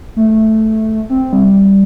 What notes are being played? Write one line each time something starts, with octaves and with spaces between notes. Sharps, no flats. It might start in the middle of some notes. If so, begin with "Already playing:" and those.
A3
C4
G3